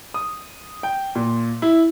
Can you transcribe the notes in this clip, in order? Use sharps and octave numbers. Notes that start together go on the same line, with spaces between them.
D#6
G5
A#2
E4